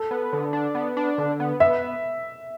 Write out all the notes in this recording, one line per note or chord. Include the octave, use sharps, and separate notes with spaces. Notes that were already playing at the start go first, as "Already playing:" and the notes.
Already playing: A4
B3
D3
D4
B3
D4
D3
B3
B3 E5